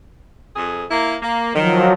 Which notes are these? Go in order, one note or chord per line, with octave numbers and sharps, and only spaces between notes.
F2 G#4
A#3 E4
A#3
D#3 F3 F#3